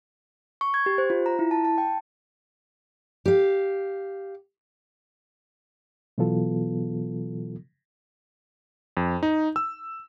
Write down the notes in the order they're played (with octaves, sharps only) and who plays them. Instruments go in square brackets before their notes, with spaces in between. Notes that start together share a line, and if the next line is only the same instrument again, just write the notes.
[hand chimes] C#6
G#6
G4
C5
F4
A#5
E4
A5
A5
G5
[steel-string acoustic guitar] G4 F5
[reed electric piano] B2 E3 F#3 B3 F4 A4
[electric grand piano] F2
D#4
E6